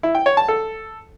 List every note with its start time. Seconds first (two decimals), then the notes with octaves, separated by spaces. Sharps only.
0.03 E4
0.15 G5
0.26 C#5
0.37 A5
0.48 A4